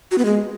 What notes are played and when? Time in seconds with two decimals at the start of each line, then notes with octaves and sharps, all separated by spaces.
0.11 F#4
0.18 B3
0.25 G#3